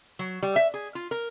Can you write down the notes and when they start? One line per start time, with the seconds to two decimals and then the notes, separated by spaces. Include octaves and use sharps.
0.19 F#3
0.43 G3
0.56 E5
0.74 G#4
0.95 F4
1.11 A#4